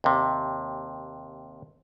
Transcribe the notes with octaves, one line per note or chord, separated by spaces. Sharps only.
D#2 C3